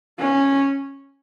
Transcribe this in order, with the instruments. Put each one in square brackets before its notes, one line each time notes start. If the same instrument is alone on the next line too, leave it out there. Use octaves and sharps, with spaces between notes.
[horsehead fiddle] C#4